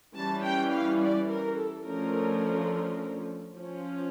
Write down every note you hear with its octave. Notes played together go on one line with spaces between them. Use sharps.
E3 G3 C#4 A5
G5
F5
D5
A#4
A4
D3 F3 A3 C#4 A#4
F3 C#4